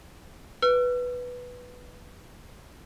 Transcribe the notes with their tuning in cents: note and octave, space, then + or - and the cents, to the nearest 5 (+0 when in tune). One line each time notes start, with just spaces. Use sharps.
B4 +0 E6 +45